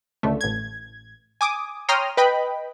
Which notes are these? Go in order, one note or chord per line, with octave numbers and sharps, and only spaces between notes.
C#2 D3 A3
A1 G#6
G#5 D6 D#6
C#5 G5 A#5 C6 D#6 F6
B4 D#5 G5 B5